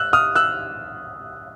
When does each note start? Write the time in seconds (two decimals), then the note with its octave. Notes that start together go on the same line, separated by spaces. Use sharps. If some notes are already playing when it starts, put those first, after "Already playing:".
Already playing: E6 F#6
0.13 D#6 F6
0.35 E6 F#6